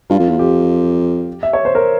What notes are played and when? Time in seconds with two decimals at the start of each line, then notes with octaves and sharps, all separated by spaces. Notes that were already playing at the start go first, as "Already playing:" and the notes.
0.10 G2 F4
0.20 F2
0.29 E2
0.39 F2 G4
1.43 E5
1.53 C#5
1.65 C5
1.75 A#4